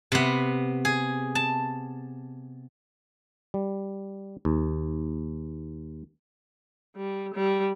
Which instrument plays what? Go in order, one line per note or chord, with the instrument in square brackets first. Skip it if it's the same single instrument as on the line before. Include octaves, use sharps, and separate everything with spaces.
[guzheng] C3 B3
G#4
A5
[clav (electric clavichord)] G3
D#2
[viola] G3
G3